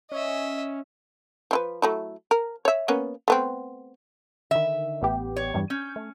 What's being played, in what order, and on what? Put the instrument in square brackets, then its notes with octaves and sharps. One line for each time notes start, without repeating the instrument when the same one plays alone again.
[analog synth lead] C#4 [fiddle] D#5 E5
[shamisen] F3 E4 B4
F#3 A3 E4
A#4
C#5 E5
A#3 B3 C#4
A3 B3 C4
[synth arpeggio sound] D3 D#3 [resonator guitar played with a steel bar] E5
[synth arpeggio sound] A1 B3 G4
[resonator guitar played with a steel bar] C#5
[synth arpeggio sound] E2 G2 G3
[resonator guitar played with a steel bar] C#4 [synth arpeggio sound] G6
[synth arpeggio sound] A3